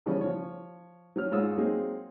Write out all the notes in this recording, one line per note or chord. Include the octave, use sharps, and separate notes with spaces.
C#3 E3 F3 G3 B3 C#4
F3 C#5
F#3 C#4 F6
G#2 G#3 F4 C#5 D#6 E6
F#3 G#3 A#3 C4 D#4 G#4